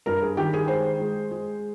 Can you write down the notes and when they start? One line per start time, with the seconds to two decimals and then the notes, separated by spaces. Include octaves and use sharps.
0.06 G2 A#4
0.22 G#4
0.37 D#3 G4
0.53 G#4
0.68 G#3 C5
1.00 G#3
1.31 G#3